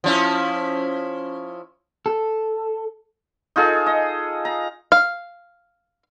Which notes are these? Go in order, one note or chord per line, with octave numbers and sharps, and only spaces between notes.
F3 C#4 E4
A4
D#4 F4 G#4 A4
D#5
A#5
F5